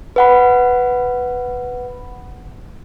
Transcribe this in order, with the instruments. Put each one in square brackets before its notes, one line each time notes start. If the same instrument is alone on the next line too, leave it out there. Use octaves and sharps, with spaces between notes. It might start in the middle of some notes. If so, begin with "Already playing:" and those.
[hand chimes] B4 F#5 B5